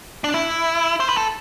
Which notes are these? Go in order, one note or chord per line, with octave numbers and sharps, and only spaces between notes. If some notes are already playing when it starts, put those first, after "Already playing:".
D4
E4
C5
B4
A4